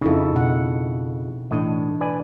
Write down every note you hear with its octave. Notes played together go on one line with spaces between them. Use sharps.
F2 C#3 D#4 E4 A4
B2 F#5
A2 E3 D4 D#5
B4 D5 G#5